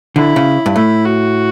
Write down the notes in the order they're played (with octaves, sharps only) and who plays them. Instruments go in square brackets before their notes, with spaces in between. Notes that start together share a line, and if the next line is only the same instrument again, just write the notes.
[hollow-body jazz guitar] D3 [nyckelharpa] E4
[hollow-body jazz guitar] C#3
G2
[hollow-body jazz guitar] A2 [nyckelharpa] E4
[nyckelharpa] F#4